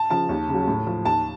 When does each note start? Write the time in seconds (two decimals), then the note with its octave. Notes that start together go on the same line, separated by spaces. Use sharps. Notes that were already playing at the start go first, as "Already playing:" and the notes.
Already playing: A5
0.10 C#3 F3 A5
0.29 D#2
0.49 C#3 F#3
0.68 A2
0.87 F3
1.05 D#2 A5